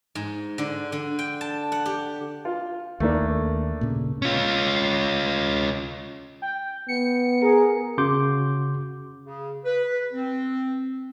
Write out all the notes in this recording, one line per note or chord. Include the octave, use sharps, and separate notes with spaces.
G#2
D3
D3
G5
A5
F#5
G4
F4
D#2 A3 A#3 D4
A#2 C#3
C#4 F4
G5
B3 C#7
G#4 A#4
C#3 F#4 C6 D6 G6
C#3
B4
C4